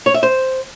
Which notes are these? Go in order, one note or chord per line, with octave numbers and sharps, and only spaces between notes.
C#5
E5
C5